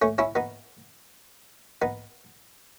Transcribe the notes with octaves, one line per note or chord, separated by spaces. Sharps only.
A3 C#4
C#4 E4
B3 D#4
B3 D#4